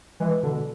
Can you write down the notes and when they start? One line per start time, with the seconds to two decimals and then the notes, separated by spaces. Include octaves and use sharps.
0.20 E3 G#3
0.43 B2 D3